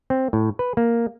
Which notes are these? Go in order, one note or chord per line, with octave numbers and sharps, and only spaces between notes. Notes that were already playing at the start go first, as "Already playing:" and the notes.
C4
A2
B4
A#3